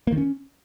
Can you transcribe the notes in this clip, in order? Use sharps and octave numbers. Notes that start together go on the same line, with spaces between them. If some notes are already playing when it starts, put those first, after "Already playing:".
A#3
D#3
C#4